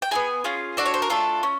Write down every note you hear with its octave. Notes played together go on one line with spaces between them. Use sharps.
G5
B3 E4 G#4 G#5
C#4 F4 G#4
D4 F#4 A4 D5
C#5
C5
A#4
A3 D4 F4 A4
C#4